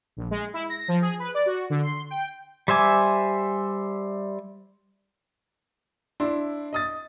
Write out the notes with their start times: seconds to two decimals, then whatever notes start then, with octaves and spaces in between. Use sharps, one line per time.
0.17 A#1
0.31 G#3
0.54 E4
0.70 A#6
0.88 F3
1.02 G#4
1.19 B4
1.34 D5
1.46 F#4
1.70 D3
1.83 C6
2.10 G5
2.68 G3 C5 E5 G#5 D6
6.20 D4 E4 C6 E6
6.73 D#5 D#6 A6